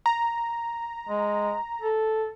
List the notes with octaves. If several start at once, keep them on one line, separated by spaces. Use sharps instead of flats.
A#5
G#3
A4